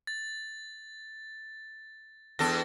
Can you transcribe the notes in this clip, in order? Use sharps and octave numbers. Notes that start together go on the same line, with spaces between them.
A6
E2 D4 A4 A#6